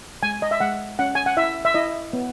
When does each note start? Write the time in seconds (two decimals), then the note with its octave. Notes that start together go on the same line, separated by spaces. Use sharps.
0.23 G#3 G#5
0.42 D#5
0.51 E5
0.60 G#3 F#5
0.99 C#4 F#5
1.15 G#5
1.26 F#5
1.37 E4 E5
1.65 E5
1.74 E4 D#5
2.13 B3